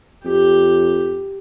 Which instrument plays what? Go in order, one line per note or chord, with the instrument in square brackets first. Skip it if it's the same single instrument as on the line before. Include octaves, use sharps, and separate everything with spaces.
[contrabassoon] F2 [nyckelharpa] G4